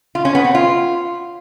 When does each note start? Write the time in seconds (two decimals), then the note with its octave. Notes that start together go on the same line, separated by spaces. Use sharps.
0.15 F4
0.25 C#4
0.35 B3
0.45 C4
0.55 F4